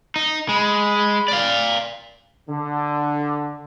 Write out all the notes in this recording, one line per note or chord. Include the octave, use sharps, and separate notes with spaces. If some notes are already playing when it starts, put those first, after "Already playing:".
D#4
G#3 B5
D5 F5
D3